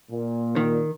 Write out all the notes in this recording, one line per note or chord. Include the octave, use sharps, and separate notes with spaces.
A#2
D#3